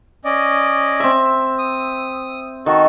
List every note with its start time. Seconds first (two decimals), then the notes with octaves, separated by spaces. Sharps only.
0.25 C#4 D5 D#5
1.00 C4 E5
1.58 D#6
2.66 D#3 F#4 A4